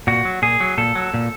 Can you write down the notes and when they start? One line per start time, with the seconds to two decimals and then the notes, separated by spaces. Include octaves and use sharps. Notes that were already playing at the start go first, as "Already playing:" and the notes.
0.07 A#2 F#4
0.25 F#3
0.42 A#2 G#4
0.60 F#3
0.78 A#2 A4
0.95 F#3
1.14 A#2